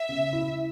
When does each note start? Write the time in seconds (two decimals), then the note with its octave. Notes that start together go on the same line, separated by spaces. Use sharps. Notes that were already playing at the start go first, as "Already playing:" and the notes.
Already playing: E5
0.09 C#3
0.33 E4